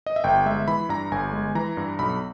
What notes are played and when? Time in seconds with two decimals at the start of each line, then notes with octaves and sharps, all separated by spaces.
0.06 D#5
0.16 E5
0.24 G1 G5
0.46 G#3 E5
0.67 E3 B5
0.89 G2 A#5
1.11 G1 G#5
1.33 G#3
1.55 E3 A#5
1.77 G2
1.99 B1 B5